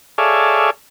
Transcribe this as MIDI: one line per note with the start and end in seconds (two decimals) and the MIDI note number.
0.18 0.70 68
0.18 0.70 69
0.18 0.70 73
0.18 0.70 74
0.18 0.70 76
0.18 0.70 77